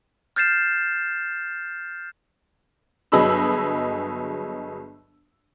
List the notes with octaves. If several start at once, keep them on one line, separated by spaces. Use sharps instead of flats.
F6 G6 A6 C7 E7
G1 F#3 G#4 D#5 B5 E6